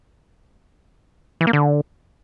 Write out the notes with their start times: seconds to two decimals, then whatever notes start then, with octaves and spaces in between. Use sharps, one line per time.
1.41 E3
1.47 A#3
1.53 D3